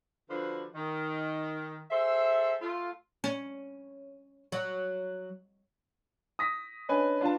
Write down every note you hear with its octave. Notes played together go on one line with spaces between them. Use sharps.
D3 F3 D4 F#4 B4
D#3
G#4 A4 C5 E5
A3 F4
C#4
F#3
D#6 A#6 B6
C#4 D4 B4 D#5 G#5
D4 F4 B4 A5